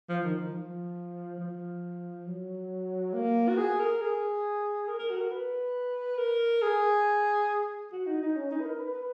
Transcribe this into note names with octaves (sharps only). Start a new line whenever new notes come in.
F3
D#3
F3
F3
F3
F#3
A#3
F#4
G#4
A#4
G#4
A#4
A#4
F#4
A#4
B4
A#4
G#4
F#4
D#4
D#4
C#4
D#4
B4
A#4
B4
B4